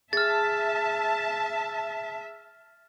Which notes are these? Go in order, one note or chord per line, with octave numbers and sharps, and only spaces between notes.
G#4 E5 A5 F6 A6